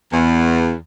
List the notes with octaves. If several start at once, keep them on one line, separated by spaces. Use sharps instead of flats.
E2